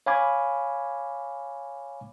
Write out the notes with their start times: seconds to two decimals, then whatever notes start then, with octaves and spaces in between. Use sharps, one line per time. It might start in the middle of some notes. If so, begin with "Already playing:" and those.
0.06 C#5 F5 G#5 B5 D6 G#6